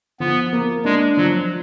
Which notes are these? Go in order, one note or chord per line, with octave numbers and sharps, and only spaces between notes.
F3 B3
A#3
G#3 D4
F3 F#3